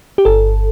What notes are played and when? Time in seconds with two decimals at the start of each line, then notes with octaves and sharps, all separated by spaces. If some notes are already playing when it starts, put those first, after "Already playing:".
0.18 G4
0.25 G1 A4